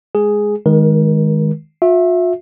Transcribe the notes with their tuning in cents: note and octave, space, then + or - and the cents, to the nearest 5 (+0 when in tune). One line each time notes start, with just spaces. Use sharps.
G#3 +0 G#4 +0
D#3 +0 G#3 +5 A#4 +35
F4 +45 E5 +0